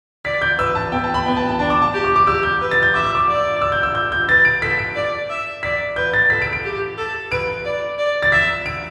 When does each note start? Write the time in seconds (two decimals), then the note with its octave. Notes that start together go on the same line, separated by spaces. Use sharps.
0.25 D5 B6
0.41 G6
0.58 B4 E6
0.75 A5
0.92 B3 G5
1.04 A5
1.14 B5
1.26 B3 G5
1.37 A5
1.49 A5
1.59 D4 A5
1.70 D6
1.82 A5
1.94 G4
2.04 D6
2.16 D6
2.26 G4 E6
2.43 G6
2.61 B4
2.71 A6
2.83 G6
2.94 E5 D6
3.05 E6
3.15 D6
3.28 D5
3.61 E6
3.72 G6
3.83 E6
3.95 G6
4.12 G6
4.29 B4 A6
4.45 D7
4.62 A4 B6
4.79 D7
4.95 D5
5.30 E5
5.63 D5 B6
5.96 B4 G6
6.14 A6
6.30 A4 B6
6.42 D7
6.53 D7
6.64 G4
6.97 A4
7.31 B4 D7
7.65 D5
7.98 D5
8.22 A6
8.32 E5 B6
8.66 D7